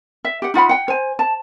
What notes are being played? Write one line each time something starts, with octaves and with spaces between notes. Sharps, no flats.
E5
G4 F#5
D#4 F4 F#5 B5
F#5 G5
C5 G#5
A5